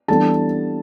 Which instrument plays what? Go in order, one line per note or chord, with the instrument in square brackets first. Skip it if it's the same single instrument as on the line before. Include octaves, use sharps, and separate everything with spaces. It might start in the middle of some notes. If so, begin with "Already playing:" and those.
[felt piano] E3 G3 B3 D4 A4 A5